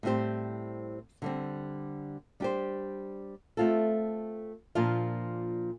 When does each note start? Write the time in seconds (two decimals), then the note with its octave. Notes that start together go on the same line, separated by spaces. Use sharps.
0.03 A2 G3 C4 G4 C5
1.22 D3 G3 C4
2.40 G3 D4 G4 C5
3.57 A3 C4 F4 A4
4.75 A#2 F3 A#3 D4 F4